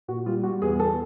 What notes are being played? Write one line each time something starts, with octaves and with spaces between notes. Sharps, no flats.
A#2 F#4
G3 F4
G3 F#4
E2 G#4
E2 A4